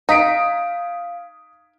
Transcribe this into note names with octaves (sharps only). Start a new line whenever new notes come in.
D#4 F5 D#6 B6 D7